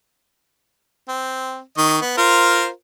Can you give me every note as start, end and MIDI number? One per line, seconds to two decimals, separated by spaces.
1.09 1.60 60
1.78 1.98 51
1.78 1.98 75
1.78 1.98 85
2.01 2.12 59
2.18 2.68 65
2.18 2.68 70
2.18 2.68 72